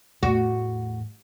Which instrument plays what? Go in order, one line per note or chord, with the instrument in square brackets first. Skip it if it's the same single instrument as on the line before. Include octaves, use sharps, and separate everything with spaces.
[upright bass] E2 A2 [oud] F#4